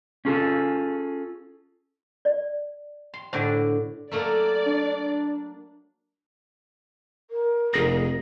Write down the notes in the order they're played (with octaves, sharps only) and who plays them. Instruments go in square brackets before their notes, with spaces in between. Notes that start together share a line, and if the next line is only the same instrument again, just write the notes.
[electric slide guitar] C#4 F4 G#4 A4
[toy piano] D5
[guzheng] C6
[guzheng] A2 D3 D5 [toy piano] C5 F#5
[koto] F#3 A3 A#3 [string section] D5
[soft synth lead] D4
[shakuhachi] A#4
[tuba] F1 [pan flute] G#4 [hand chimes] A#6